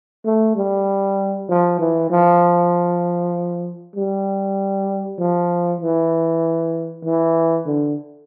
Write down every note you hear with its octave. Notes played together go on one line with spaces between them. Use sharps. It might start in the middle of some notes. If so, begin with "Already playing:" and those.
A3
G3
F3
E3
F3
G3
F3
E3
E3
D3